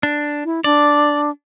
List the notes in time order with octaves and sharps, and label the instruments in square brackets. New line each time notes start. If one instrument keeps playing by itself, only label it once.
[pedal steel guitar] D4
[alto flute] E4
[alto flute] D4 [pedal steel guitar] D5